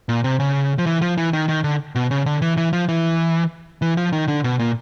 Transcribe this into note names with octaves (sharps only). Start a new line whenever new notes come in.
A#2
C3
C#3
F3
E3
F3
E3
D#3
D#3
D3
B2
C#3
D3
E3
E3
F3
E3
E3
F3
D#3
D3
B2
A#2